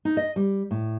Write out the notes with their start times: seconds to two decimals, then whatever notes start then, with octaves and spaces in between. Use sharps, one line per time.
0.05 D#4
0.17 D#5
0.36 G3
0.71 A2